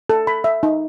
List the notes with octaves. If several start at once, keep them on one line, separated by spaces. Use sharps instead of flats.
A4
B5
E5
D#4